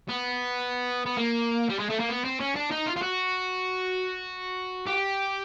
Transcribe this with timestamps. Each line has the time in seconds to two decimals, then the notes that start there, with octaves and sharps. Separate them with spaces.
0.09 B3
1.06 B3
1.17 A#3
1.69 G3
1.79 G#3
1.89 A3
1.99 A#3
2.09 B3
2.25 C4
2.40 C#4
2.56 D4
2.71 D#4
2.86 F4
2.96 F4
3.02 F#4
4.87 G4